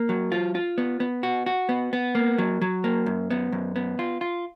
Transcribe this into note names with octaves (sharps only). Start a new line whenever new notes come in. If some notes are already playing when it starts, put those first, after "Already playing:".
Already playing: A#3
F#3
F4
F4
B3
B3
F#4
F#4
B3
B3
A#3
F#3
F#3
A#3
F#2
B3
F#2
B3
F4
F4